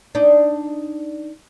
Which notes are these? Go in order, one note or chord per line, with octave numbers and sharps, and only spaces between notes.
D4 D#4